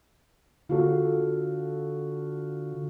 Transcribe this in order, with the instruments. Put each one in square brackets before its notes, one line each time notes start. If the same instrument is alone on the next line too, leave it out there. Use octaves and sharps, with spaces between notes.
[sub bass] D3 [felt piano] F4 F#4 A4